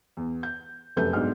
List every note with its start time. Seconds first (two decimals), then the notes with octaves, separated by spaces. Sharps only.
0.17 E2
0.43 G6
0.96 F1 F#2 A3 B4 G6
1.13 B1 G#2 D4 F6